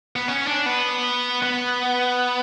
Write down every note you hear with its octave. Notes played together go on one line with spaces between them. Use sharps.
B3
C#4
D4
B3
B3